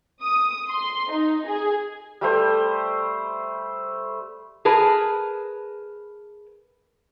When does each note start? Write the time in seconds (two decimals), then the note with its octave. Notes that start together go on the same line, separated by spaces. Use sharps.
0.21 D#6
0.70 C6
1.12 D#4
1.47 G#4
2.21 G3 A3 C5
4.65 G#4 A#4 B4 A5